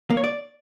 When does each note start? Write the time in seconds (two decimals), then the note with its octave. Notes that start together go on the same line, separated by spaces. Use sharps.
0.10 A#3
0.17 C#5
0.24 D5